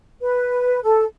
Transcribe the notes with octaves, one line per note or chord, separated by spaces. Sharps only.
B4
A4